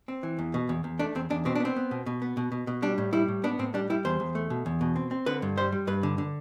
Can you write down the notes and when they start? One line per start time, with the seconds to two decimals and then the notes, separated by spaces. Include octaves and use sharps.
0.08 C4
0.23 E3
0.39 E2
0.54 B2
0.69 E2
0.84 E2
0.99 A3 D4
1.15 E2 C4
1.30 E2 D4
1.45 B2 C4
1.55 D4
1.60 B3 C4
1.76 B3
1.91 B2
2.06 B2
2.22 B3
2.37 B2
2.52 B2
2.67 B2
2.82 G3 D4
2.98 A2
3.13 G3 E4
3.28 A2
3.44 B3 D4
3.59 A2 C4
3.74 G3 D4
3.90 G3 E4
4.05 E2 C5
4.20 E2
4.35 A3
4.50 B2
4.66 E2
4.81 B2
4.96 C4
5.11 C4
5.26 D3 B4
5.42 G2
5.57 G3 C5
5.72 G3
5.87 G2 B4
6.03 D3
6.18 D3